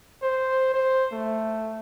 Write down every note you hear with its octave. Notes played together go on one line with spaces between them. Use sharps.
C5
C5
A3